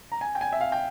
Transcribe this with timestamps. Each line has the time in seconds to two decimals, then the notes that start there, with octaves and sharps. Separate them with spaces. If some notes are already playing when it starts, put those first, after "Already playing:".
0.12 A#5
0.21 G#5
0.35 G5
0.41 G#5
0.53 E5
0.61 F5
0.72 G5